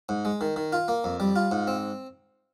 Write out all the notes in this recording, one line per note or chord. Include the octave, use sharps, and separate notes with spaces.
G#2
G#3
D#3
D#3
F4
A#3
F2
G3
F4
G#2
C4